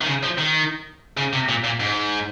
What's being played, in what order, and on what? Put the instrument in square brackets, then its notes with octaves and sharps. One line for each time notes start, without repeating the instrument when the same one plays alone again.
[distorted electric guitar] D#3
C#3
F3
D#3
C#3
C3
A#2
A#2
G#2